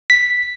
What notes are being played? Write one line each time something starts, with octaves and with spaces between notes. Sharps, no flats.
B6